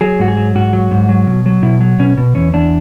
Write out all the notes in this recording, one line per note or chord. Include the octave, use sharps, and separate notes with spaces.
F#3 G#4
G#2 F#4
G#4
F#3
G#2 F#4
F#3
G#2
F#3
B2
F#3
B2 E4
F#3
B2 C#4
B2
E2 C#4
E2 D4